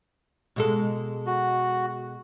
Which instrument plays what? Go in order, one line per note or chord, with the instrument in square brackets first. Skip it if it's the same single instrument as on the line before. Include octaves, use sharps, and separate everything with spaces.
[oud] B2 G#3 A4
[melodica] F#4